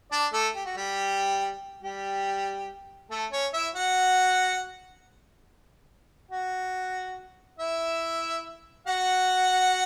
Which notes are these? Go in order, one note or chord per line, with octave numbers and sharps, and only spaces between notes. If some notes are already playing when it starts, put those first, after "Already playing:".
D4 D5
A3 A4
G4
F#4
G3 G4
G3 G4
A3 A4
C#4 C#5
E4 E5
F#4 F#5
F#4 F#5
E4 E5
F#4 F#5